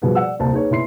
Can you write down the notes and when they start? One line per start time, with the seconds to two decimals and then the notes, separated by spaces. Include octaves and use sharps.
0.02 B2 F3 G3 F#4 G#4 B4
0.15 D5 F#5 E6
0.39 D#1 C2 C5 A5
0.53 D#4 G#4 B4 C#5
0.71 B2 E4 C6 C7